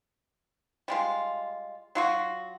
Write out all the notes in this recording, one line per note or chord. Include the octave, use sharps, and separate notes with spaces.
G3 G#3 F4
F#3 F4 F#4